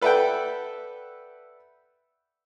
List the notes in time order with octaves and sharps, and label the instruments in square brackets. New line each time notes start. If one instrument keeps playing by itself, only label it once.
[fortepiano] A4 B4 D5 E5 F#5 G5